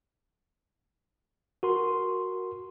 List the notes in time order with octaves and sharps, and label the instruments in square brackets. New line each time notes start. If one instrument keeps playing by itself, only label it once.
[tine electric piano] F#4 A#4 C6